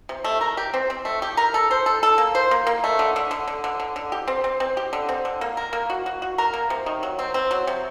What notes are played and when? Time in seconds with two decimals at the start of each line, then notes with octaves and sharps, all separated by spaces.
0.09 C3
0.24 A3
0.41 A#4
0.57 G4
0.74 C4
0.90 C4
1.05 A3
1.22 G4
1.37 A#4
1.54 A4
1.71 C5
1.86 A4
2.03 A4
2.18 A#3
2.35 C5
2.51 A#3
2.67 A#3
2.84 A3
2.99 D3
3.16 D3
3.31 D3
3.48 D3
3.64 D3
3.80 D3
3.96 D3
4.12 G4
4.28 C4
4.44 C4
4.60 C4
4.77 G4
4.93 D3
5.09 C4
5.25 D3
5.41 A#3
5.57 A#4
5.73 A#3
5.90 F#4
6.06 F#4
6.22 F#4
6.38 A#4
6.54 A#3
6.70 C3
6.86 D#3
7.03 F#3
7.19 C4
7.34 C4
7.51 F#3
7.67 C3